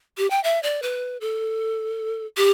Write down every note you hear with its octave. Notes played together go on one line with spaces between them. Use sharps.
G4
G5
E5
D5
B4
A4
G4